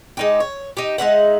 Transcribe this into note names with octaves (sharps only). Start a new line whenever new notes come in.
G#3 D#4 G4
C#5
D#4 G4
G#3 D#4 E5 F#5